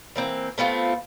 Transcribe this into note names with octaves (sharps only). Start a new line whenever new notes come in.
E3 A#3 C4
A3 B3 C4 F4